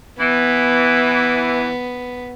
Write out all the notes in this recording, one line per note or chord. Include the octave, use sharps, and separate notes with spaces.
E3 B3